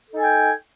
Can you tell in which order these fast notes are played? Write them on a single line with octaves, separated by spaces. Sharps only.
A4 D#4 G#5 G5